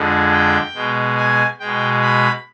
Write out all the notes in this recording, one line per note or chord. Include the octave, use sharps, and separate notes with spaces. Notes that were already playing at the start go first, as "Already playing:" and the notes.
Already playing: F2 D3 G#3
G5
B2 G#3
G#5
B2 G#3 G5
B5